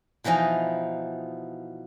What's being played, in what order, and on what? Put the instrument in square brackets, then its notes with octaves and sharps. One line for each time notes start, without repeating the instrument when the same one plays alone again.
[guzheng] B2 E3 F3 D#4 D#5